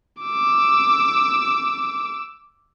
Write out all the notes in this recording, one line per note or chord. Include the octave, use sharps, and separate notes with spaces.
D6 E6